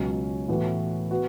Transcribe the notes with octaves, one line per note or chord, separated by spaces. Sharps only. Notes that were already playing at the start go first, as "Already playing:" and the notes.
Already playing: C#2 B2 F#3 C#4
A2 E3 B3 F#4
B3 F#4